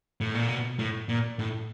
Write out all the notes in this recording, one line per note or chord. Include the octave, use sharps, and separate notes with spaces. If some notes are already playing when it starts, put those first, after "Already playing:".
A2
A#2
B2
A2
A#2
A2